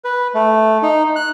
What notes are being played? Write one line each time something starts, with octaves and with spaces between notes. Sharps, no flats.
B4
A3
D#4
F#6